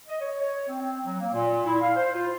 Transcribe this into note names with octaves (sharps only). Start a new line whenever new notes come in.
D#5
C#5
C#5
C4
C4
F#3
A#3
A#2
E4
F5
C5
F4